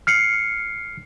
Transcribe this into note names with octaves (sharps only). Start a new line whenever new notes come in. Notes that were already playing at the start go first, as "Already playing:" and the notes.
F6 C7 C#7